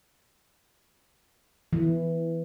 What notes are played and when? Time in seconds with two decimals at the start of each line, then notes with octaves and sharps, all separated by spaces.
1.73 E3